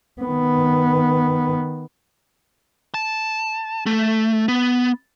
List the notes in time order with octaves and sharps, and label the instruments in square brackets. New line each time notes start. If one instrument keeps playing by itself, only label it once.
[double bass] D#3 B3
[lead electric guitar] A5
A3
B3